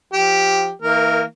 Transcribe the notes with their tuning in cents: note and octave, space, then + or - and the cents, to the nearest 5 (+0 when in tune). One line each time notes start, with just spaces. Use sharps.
F3 +0 G4 +0
E3 -40 A#3 -25 A#4 +0